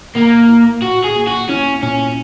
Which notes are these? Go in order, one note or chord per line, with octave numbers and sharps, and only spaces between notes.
A#2 A#3
E4
A#2 F#4
G#4
A#3
F#4
C#4 E4
A#2 C#4